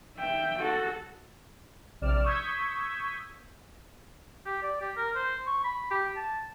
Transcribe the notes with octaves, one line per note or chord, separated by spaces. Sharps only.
E5 G5
F#4 A4
A#1 C3 D5 F6 E7
C#6 D#6 E6 G6 G#6 B6
G4
D5
G4
A#4
C5
C#6
B5
G4
A5